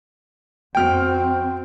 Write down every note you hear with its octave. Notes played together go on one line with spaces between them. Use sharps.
F2 C4 F#4 G5 F6 D7